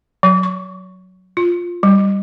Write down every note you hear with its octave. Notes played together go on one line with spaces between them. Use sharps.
F#3
C#6
F4
G3